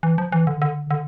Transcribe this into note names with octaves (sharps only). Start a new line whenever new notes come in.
E3
F3
E3
D3
D3
D3